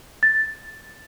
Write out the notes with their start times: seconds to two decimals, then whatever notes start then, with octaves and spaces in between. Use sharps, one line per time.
0.23 A6